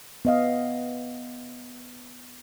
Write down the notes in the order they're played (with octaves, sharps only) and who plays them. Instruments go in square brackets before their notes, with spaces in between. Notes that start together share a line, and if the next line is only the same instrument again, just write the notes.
[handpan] B3 D#5 F5